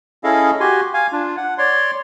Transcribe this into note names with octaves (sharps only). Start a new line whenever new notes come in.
C#4 E4 G#4 A4 D#5 F5
F#4 G4 G#5 C6
F5 G#5
D4 F4
F#5
C#5 D5 C6